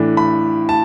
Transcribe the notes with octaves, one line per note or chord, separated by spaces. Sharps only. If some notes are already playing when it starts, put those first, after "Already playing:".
Already playing: A2 E3 A3 D4
B5
A5